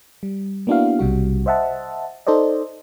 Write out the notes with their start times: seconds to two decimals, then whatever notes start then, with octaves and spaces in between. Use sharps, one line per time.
0.23 G3
0.67 A#3 B3 D4 E4 F#4 F5
0.99 B1 C3 G3 F#4
1.46 C5 D#5 E5 F#5 A5
2.27 D#4 A4 C5 D5 D#5